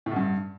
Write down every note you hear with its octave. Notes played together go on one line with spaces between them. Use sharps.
A2
B2
G2